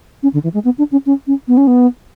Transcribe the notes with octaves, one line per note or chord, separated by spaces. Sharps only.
C#4
D3
E3
G#3
B3
D4
C#4
C#4
C#4
B3
C#4
B3